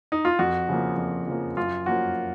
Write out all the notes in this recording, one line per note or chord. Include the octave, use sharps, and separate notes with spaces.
D#4
F4
F2 F#4
C#3 F3 A#3
F2
C#3 F3 A#3
F#2 F4
F3 A#3 C#4 F#4